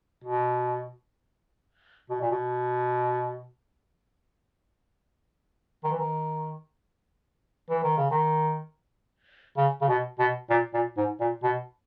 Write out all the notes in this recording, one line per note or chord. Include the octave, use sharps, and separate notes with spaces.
B2
B2
A#2
B2
D#3
E3
D#3
E3
D#3
C#3
D#3
C#3
C#3
B2
B2
A#2
A#2
G#2
A#2
B2